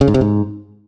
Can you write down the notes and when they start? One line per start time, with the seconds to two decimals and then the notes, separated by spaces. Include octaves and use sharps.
0.01 C#3
0.08 G#2
0.14 C3
0.21 G#2